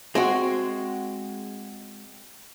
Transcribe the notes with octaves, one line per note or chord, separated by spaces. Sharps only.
G#3 C4 F#4